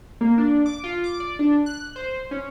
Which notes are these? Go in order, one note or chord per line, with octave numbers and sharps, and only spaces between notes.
A#3
D4
D6
F4
D6
D5
D4
F#6
C5
C#4